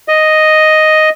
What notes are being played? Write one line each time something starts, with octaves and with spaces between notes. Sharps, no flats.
D#5